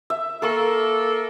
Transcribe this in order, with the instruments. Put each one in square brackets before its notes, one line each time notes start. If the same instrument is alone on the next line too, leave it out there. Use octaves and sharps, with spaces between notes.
[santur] E5
[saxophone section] A#3 A4 [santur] A#4 C#6